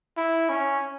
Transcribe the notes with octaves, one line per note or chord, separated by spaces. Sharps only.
E4
C#4